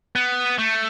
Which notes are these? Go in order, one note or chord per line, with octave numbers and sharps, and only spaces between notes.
B3
A3